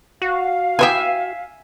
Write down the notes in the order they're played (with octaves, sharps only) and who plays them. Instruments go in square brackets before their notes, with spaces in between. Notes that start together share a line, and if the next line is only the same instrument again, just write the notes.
[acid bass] F#4 [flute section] F5
[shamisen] E3 B3 G4 [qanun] E5 G#5